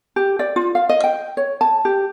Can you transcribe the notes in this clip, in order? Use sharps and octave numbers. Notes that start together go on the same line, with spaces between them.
G4
D5
F4
F5
D#5
G5
C#5
A5
G4